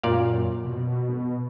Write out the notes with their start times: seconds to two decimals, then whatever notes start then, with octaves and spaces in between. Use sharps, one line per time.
0.03 F#2 A#2 D5 F5
0.65 B2